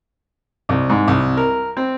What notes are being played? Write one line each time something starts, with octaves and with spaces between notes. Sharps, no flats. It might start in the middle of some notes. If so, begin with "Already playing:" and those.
C2
G#2
C2
A#4
C4